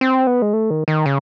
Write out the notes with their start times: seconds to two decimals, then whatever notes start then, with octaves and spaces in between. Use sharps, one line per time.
0.01 C4
0.27 B3
0.42 G#3
0.53 A3
0.70 D#3
0.88 D#3
1.06 C#3